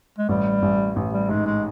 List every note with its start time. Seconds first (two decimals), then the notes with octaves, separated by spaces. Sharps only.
0.18 G#3
0.29 A1 G3
0.62 A1
0.96 A1
1.13 G3
1.29 G#2 G#3
1.46 G#3